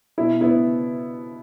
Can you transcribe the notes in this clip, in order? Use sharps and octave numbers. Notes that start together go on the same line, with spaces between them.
B2 E4
B3 E4